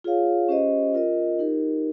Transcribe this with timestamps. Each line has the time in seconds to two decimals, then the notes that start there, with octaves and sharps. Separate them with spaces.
0.04 F4 G#4 C#5 F5
0.49 C#4 G4 C5 D#5
0.94 F4 A#4 D#5
1.39 D#4 G4 A#4